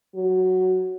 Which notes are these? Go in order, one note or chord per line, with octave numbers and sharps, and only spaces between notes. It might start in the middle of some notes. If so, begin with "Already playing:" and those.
F#3